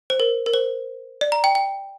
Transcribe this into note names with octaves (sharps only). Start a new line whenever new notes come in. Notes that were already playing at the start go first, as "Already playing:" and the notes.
C5
A#4
A#4
C5
D5
A#5
G5
G5